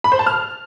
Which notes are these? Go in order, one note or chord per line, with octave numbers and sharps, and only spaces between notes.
B5
C5
A5
F6